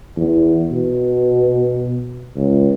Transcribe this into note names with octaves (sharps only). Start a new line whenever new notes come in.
E2
B2
C#2